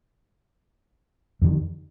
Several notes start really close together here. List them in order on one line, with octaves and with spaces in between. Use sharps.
F2 D3 D#3